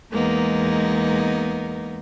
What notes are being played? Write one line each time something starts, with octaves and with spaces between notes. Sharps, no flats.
E2 G#3 A#3 B3 D#4